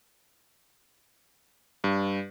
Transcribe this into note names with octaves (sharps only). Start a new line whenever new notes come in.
G2